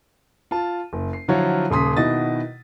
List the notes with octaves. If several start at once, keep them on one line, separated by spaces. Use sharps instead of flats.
F4 A5
F#1
C7
D3 F3 F#3 E4 F4 C#5
D#1 C#3 C6 D#6 B6
B2 D#3 E4 F#4 D#5 A6